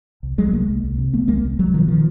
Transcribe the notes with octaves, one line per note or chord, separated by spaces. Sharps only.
C2
C2 F#3 G#3
C2 G#3 A#3
C2
C2
C3
C2 A3 B3
C2 G#3 A#3
C2
C2 F#3 G#3
B2 D#3 F3
B2 D#3 F3